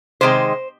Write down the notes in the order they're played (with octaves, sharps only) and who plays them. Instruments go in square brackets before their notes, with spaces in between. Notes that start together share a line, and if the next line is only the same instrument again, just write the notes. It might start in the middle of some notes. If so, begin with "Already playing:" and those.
[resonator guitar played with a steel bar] C3 D#3 G#3 C5